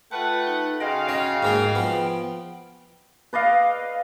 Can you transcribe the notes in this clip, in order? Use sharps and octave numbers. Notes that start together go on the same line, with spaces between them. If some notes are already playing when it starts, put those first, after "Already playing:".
A3 F4 B4 F#5 G5 A5
D#4
C#3 F#4 D#5 F5 G5 C6 D#6
C#4 D#5 G5 G#5
G#2 A#3 D#4
F3 B3
B4 D5 D#5 F5